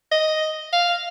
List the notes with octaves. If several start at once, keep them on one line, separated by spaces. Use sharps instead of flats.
D#5
F5